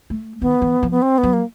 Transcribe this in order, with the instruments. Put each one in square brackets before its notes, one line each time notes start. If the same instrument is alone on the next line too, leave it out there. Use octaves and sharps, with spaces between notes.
[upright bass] A3
[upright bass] D#3 [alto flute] B3
[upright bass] E3
F3
[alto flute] B3
C4
B3
[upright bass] F#3
[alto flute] A#3